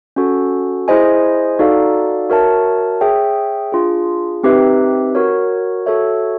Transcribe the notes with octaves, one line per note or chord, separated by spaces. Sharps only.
C#4 F#4 A4
E4 G#4 C5 D#5 G#5
D#4 F#4 A4 D5 F5
F#4 A#4 C#5 E5 A5
G#4 C#5 E5 G5
D4 F4 G#4
C4 D#4 G4 B4 E5
F#4 A#4 C#5
F#4 A4 C#5 E5